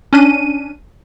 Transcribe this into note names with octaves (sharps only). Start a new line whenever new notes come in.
C#4 D4 D#7